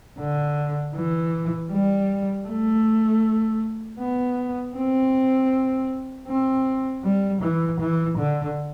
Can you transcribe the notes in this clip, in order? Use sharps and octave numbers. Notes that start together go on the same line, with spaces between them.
D3
E3
G3
A3
B3
C4
C4
G3
E3
E3
D3